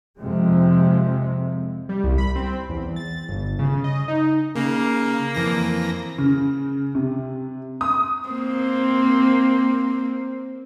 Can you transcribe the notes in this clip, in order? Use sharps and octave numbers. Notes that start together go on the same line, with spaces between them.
F2 C3 G#3
G3
C2
B5
C4
E2
A6
G1
C#3
D#5
D#4
C#3 A#3
F2 E3 A#6
C#3
C3
D#6
A#3 C4